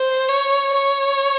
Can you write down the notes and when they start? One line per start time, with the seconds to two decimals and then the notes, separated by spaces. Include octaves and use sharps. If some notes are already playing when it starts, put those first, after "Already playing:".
Already playing: C5
0.29 C#5
0.75 C#5